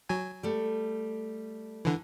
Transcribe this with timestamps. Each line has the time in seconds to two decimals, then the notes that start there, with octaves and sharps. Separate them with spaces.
0.09 F#3 G#5
0.43 G3 A3
1.85 D3 E3